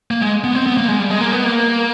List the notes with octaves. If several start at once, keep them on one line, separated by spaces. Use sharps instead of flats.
A#3
G#3
B3
C4
B3
A#3
G#3
G3
G#3
A#3
B3
A#3